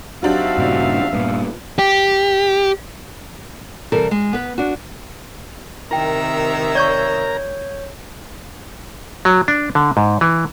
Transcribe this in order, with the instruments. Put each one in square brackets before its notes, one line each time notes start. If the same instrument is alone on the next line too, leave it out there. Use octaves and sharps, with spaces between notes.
[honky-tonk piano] F#3 D4 G4 [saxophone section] C4 D#4 F#4 [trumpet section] E5 F5
[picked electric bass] G2 A#2 C#3
[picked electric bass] G2 A#2 [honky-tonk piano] B3
[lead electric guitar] G4
[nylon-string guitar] C3 E3 G3 A4 A#4
G#3
B3 B4
D4 F#4
[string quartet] C3 D#3 E5 [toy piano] E4 G5 [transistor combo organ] A#4 A#5
[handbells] C#5 G6 [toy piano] D5 C#6
[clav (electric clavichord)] F#3
D4
D3
G#2
E3